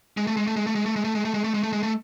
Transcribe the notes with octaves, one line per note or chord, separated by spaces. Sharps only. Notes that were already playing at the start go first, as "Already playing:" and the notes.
G#3
A3
G#3
A3
G#3
A3
G#3
A3
G#3
A3
G#3
A3
G#3
A3
G#3
A3
G#3
A3